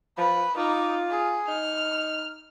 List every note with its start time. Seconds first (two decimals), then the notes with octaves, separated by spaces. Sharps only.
0.18 F3 B4
0.57 D#4 F4 D6
1.11 G#4
1.48 D#4 F6